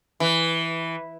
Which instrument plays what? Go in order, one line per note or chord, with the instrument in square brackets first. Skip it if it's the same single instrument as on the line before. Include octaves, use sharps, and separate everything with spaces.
[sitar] E3